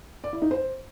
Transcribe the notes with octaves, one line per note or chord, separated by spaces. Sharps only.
D5
E4
D#4
C5